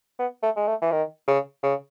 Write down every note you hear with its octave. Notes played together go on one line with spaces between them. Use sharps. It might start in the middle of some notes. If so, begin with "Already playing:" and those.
B3
A3
G#3
A3
E3
D#3
C#3
C#3